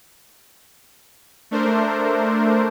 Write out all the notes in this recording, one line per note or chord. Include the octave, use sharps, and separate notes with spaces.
A3 D4 A#4 C5